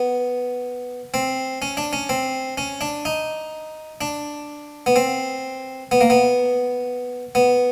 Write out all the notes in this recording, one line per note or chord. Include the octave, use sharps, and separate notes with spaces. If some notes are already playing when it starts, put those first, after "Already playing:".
Already playing: B3
C4
C#4
D4
C#4
C4
C#4
D4
D#4
D4
B3
C4
B3
A#3
B3
B3